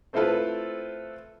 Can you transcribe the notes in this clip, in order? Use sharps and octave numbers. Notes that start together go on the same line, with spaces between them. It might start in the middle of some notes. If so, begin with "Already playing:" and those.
A3 C4 E4 F4 A4 B4